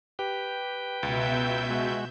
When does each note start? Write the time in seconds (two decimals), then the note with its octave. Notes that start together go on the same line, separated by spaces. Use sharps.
0.19 G4 B4 G5
1.03 C#2 B2 E5 G6
1.70 G#3 F#4